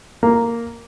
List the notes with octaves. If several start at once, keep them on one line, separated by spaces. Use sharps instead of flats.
A#3